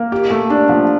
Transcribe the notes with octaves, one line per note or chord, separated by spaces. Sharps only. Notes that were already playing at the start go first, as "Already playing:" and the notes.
Already playing: A#3
G4
A3
D4
F3